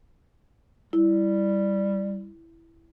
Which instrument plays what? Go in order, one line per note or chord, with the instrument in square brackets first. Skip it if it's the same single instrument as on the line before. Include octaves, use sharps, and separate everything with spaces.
[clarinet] G3 [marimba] E4